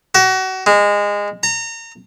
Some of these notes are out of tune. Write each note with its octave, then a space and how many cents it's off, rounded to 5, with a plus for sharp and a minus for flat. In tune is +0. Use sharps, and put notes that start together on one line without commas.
F#4 +30
G#3 -20
A#5 -30